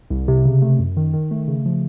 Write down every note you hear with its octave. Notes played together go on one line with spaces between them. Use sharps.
C2
C3
C#3
A3
F#2
D#3
D#3
A3
C#3
F3